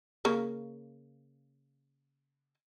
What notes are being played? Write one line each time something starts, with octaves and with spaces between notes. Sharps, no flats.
C#3 A#3